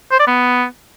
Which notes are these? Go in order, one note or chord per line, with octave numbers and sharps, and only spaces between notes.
C5
D5
B3